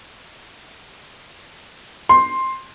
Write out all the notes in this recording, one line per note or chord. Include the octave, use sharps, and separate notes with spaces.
C6